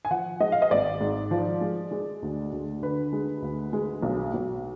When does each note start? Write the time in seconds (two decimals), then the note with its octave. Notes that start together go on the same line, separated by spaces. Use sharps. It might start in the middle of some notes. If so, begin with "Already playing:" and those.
0.05 G#5
0.11 F3 F#5
0.40 G#3 D#5
0.52 F5
0.62 D#5
0.71 G#1 D5
1.01 G#2
1.31 F3
1.61 G#3
1.91 G#3
2.22 D2
2.53 D2
2.82 D3 B4
3.13 G#3
3.42 D2
3.73 G#3
4.03 B1
4.34 B1